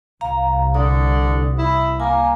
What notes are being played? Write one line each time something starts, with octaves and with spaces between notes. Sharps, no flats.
C2 F5 A#5
D3 D#6
E4
A#3 G#5 A#5